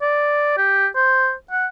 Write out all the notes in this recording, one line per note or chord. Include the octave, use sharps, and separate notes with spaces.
D5
G4
C5
F#5